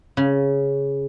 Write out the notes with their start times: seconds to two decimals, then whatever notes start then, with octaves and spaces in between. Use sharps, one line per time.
0.17 C#3